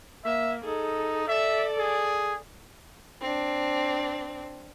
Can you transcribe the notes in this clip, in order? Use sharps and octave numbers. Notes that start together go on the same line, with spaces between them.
A#3 E5
D#4 G#4 A4
A4 D5 E5
G#4
C4 D4